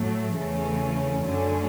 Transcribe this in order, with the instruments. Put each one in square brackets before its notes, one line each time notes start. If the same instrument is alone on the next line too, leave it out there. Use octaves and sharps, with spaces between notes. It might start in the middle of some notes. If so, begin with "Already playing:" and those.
Already playing: [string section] A2 F#3 A3
E2 C#3 E3 A3 C#4
F#2 D3 F#3 A3 C#4